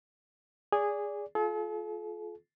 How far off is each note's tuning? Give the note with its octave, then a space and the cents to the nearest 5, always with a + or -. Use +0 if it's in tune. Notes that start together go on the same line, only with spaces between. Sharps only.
G#4 -15 D5 -20
F4 +0 A4 -45